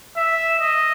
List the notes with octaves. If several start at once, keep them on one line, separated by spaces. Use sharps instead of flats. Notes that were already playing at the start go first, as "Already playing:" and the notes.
E5
D#5